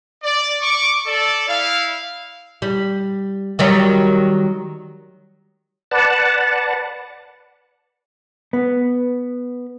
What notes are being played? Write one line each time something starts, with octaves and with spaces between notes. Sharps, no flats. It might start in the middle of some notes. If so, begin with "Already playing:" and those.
D5
C#6 D6
A4 D5
E4 F5
G3
D#3 F#3 G3
B4 D5 F#5 A5
B3